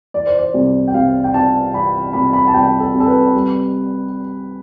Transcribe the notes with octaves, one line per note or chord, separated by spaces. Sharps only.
E3 D5
C5
D5
C2
G5
C2 F5
G5
C3 A5
E3 B5
C2 B5
B5
A5
C2 G5
A4
C3
A4
B4
G3